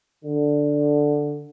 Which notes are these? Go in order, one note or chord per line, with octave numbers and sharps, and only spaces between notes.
D3